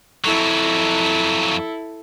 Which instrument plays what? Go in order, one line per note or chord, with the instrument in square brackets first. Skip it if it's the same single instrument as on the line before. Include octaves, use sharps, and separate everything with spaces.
[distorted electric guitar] F2 F#3 [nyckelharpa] E4 A4